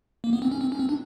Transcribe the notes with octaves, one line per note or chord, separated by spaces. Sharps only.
A#3
B3
C4
C#4
C4
C#4
C4
D4